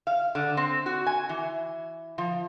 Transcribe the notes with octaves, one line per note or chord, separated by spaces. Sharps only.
F5
D3
C4
F#4
G#5
E3
F3